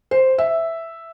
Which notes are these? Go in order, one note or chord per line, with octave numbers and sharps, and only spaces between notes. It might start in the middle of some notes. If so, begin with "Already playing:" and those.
C5
E5